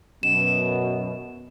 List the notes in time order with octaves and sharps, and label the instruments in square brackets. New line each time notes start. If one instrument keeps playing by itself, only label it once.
[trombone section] F#2 B2 [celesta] E7